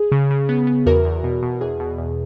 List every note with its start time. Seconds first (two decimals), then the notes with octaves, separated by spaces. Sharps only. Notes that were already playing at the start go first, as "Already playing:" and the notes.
Already playing: G#4
0.12 C#3
0.31 C#3
0.49 B3
0.67 B3
0.86 E2 F#4 A#4
1.05 E2
1.23 B2
1.42 B2
1.61 E2 G#4
1.80 B2
1.98 E2